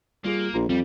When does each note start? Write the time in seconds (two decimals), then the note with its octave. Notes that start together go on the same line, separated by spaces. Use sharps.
0.24 G3 A#3 F4 G#4
0.54 A#1 F4 A#5
0.69 F2 G3 C4